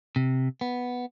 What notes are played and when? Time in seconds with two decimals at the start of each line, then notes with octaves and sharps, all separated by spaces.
0.16 C3
0.61 B3